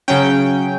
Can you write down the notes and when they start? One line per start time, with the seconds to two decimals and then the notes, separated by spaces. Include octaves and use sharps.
0.08 C#3 F#3 C#4 G5